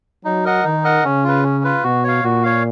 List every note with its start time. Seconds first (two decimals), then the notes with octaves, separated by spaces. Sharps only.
0.25 F#3 D#4
0.45 A#4 D#5 F#5
0.64 D#3 D#4
0.84 A#4 D#5 F#5
1.04 C#3 C#4
1.24 F4 B4
1.44 C#4
1.64 F4 B4
1.84 B2 F#4
2.04 C#5 F5
2.23 A#2 F#4
2.43 C#5 F5